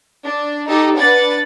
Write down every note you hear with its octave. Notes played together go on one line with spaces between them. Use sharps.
D4
D#4 G4 A4
D4 B4 F#5 A6